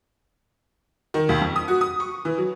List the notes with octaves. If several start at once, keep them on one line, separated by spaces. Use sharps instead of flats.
D#3
D#2
F2
D#6
F#4
D#6
C#6
E3
F#3